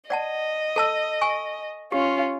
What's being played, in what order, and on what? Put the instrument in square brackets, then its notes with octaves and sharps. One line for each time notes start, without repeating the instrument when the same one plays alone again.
[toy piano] D5 F#5 A5 [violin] D#5
[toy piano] A4 A5 E6
G#5 C#6
[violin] C#4 F4 [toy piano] G4